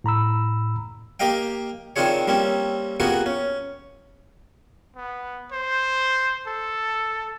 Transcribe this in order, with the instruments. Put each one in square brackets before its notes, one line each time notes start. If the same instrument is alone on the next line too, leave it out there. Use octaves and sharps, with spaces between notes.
[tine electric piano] A2 A#5 B5 E6
[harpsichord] A#3 G4 D#5 F5 G5
D#3 C4 D4 F4 G#4 C#5
G3 A#3 C4 C#4
C3 A#3 B3 F4 F#4 G#4
C#4
[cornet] B3
C5
A4